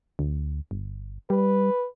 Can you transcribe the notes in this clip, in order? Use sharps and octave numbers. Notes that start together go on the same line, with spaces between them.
D2
G1
G3 B4